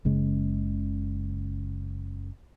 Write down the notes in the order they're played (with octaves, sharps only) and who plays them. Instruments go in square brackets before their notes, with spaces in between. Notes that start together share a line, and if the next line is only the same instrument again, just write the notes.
[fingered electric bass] F#1 C#3 G#3